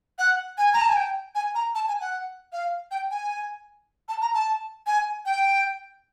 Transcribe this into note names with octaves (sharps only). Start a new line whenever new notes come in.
F#5
G#5
A#5
A5
G#5
G5
G#5
A#5
A5
G#5
F#5
F5
G5
G#5
A5
A#5
A5
G#5
G5